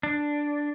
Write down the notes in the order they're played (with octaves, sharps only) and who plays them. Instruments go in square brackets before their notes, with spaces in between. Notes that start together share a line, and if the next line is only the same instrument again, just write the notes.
[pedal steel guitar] D4